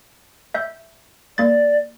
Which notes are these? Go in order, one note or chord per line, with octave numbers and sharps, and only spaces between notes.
E5 G6
A#3 D5 A6